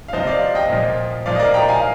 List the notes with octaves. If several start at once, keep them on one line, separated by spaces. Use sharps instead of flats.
F5
C3 F3 C5 D#5
D5 F5
D#5 G5
A#2 F3
A#2 F3 D5 F5
D#5
A#4 D5
G5 A#5
F5 G#5